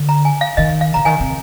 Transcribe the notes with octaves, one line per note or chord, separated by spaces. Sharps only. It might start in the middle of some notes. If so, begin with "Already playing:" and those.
Already playing: D3
A#5
G#5
F5
D#3 D#5
F5
D3 A#5
D#3 G#5
C3